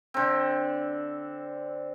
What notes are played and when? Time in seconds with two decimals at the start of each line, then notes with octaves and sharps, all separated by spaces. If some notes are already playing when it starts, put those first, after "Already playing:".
0.14 D3 C4